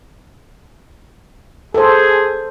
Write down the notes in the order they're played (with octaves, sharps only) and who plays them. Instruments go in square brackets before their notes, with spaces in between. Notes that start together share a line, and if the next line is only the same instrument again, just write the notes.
[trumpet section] G#4 [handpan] A4 C5